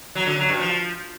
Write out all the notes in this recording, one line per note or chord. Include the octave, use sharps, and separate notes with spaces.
F#3
D3
F#3
G2
F3